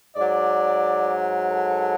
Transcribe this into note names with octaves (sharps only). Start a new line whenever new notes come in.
G#2 F#3 D5
A4